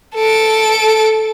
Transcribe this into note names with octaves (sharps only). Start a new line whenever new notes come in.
A4 D7